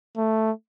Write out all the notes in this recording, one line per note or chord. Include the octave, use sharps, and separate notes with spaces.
A3